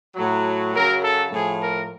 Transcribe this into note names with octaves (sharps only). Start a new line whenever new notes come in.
A2 F#3
F#2 C#3 F#3 A#4
A4
A2 F3 G#4
A#4